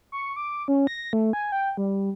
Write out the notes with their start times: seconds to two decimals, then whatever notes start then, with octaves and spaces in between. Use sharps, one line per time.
0.12 C#6
0.36 D6
0.68 C#4
0.87 A#6
1.13 A3
1.33 G#5
1.52 G5
1.77 G3